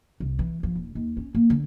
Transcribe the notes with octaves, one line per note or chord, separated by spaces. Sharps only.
C2
E3
F3
D#1
D#2
C#4
A#3
D3